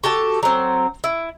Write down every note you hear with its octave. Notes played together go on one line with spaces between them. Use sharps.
F#4 G4 A4 A5
F#3 C4
E4